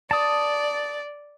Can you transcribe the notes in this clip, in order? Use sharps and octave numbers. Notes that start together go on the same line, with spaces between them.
D5 A5 D#6